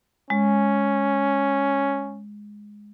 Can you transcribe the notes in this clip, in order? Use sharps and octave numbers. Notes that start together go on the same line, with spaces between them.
G#3 C#4